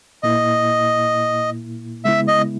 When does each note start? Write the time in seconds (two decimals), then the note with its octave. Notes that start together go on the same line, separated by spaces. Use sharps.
0.23 A#2 A#3 E4 D#5
2.05 C#3 G#3 B3 E4 E5
2.28 D#5